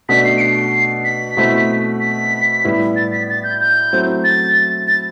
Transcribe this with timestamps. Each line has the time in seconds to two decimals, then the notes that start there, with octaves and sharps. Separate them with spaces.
0.09 B2 A3 D4 B6
0.24 C7
0.37 D7
0.41 C7
1.05 B6
1.37 B2 A3 C4 E4
2.00 B6
2.64 A2 G3 B3 E4
2.96 A6
3.12 B6
3.29 A6
3.44 G6
3.61 G6
3.92 F#3 A3 C4 E4
4.24 A6
4.87 A6